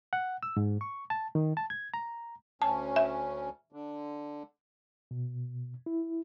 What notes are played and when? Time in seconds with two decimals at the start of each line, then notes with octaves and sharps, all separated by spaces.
0.13 F#5
0.43 E6
0.57 G#2
0.81 C#6
1.10 A5
1.35 D#3
1.57 A5
1.70 G#6
1.94 A#5
2.62 D2 C#4 A5
2.96 E5
3.72 D3
5.11 B2
5.86 E4